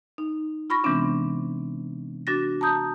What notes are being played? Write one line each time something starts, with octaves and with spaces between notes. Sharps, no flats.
D#4
F4 B5 C#6 A#6
C3 E3 G#3 B3 C4 D4
D4 F#4 A6 A#6
A5 A#5 D#6 G6